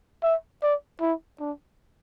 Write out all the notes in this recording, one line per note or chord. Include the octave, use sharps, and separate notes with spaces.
E5
D5
E4
D4